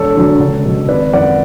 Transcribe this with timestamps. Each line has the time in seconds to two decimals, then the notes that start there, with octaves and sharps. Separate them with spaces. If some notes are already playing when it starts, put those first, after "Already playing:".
Already playing: E1 A4 C#5
0.15 E2 D3 F#3
0.39 C#2
0.64 B2 F#3
0.89 G#1 B4 D5
1.13 F#2 E3 D5 F#5